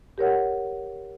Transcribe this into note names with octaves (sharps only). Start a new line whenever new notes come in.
G4 A#4 C#5 F#5